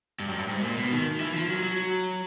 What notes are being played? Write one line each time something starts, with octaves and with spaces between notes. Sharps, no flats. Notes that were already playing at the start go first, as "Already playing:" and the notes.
G2
F#2
G2
G#2
A#2
B2
D#3
E3
F3
F#3
F#3